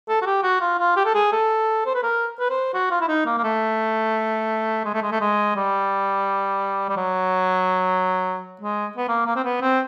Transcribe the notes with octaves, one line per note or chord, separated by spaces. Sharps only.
A4
F#4
G4
F#4
F4
F4
G4
A4
G#4
A4
C5
B4
A#4
B4
C5
F#4
F4
E4
D#4
A#3
A#3
A3
G#3
A3
G#3
A3
G#3
G3
G3
F#3
G#3
B3
A#3
A#3
C4
B3
C4